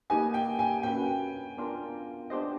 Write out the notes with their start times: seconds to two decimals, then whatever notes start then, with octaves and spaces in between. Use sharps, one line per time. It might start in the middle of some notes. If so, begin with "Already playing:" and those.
0.10 A#3 D#4 G4 B4 D#5 G#5
0.34 G5
0.59 G#5
0.83 A#3 C#4 F#4 B4 G5
1.57 B3 D4 F4 A#4
2.30 B3 D4 G4 C5 D#5